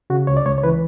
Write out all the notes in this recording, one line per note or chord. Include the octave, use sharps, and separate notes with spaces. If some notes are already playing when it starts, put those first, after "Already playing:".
C#3 F#4
C#2 C#5
D5
C#2 C#5
C#5
E3 B4